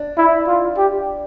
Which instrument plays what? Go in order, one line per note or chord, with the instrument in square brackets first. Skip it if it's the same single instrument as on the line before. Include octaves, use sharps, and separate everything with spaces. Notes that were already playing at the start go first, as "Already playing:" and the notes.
Already playing: [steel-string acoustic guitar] D4
[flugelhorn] E4
F4
G4